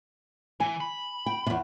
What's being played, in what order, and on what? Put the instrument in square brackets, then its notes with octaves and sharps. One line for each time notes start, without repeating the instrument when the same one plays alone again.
[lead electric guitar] E3 [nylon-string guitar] G#5
[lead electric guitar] B5
[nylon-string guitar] G5
E2 C3